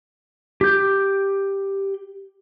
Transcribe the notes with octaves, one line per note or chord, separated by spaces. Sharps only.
G4 G6